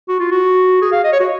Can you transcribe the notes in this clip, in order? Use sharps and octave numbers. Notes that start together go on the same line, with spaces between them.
F#4
F4
F#4
G#4
F5
D#5
C#5
F#4